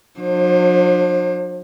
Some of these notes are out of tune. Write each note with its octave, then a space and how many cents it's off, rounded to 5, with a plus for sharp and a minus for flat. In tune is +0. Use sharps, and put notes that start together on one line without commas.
F#3 -45 D4 +30 C5 +30